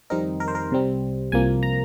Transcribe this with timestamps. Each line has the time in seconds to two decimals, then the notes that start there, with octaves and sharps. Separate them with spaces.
0.10 F2 D#3 G3 C4 D#4 A#4
0.40 A#4
0.48 C5
0.55 A#4
0.71 C2 C3 G3 C4
1.32 C2 C3 F3 A#3 G#5
1.63 A#5